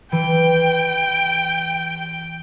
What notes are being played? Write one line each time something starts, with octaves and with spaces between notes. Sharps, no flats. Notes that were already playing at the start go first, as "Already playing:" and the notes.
E3 G5